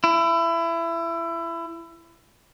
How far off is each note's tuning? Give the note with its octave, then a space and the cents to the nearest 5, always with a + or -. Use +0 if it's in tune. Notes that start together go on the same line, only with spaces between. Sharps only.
E4 +25